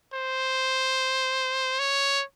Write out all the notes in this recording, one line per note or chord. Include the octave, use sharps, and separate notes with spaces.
C5
C#5